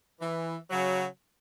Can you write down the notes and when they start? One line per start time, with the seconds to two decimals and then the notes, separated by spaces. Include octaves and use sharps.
0.21 E3
0.71 C#3 F#3